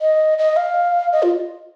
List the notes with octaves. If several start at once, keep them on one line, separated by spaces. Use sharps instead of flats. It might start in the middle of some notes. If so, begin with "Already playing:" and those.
D#5
D#5
F5
D#5
F4